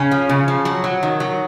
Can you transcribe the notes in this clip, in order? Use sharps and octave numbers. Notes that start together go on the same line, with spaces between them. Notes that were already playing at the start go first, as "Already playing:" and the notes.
Already playing: C#3 C#4
F3
C#3
F3
F#3
F#3
D#3
F#3